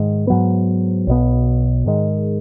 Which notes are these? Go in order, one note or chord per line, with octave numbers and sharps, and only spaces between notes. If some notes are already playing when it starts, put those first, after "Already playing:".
Already playing: G#2 D#3 G#3
G#2 F#3 B3
B1 B2 B3
G#2 D#3 G#3